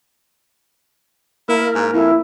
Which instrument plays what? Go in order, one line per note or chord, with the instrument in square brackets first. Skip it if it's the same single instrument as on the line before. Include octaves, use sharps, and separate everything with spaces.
[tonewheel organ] A#3 A#4 [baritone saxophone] E4
[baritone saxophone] G#2
[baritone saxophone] F2 [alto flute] E4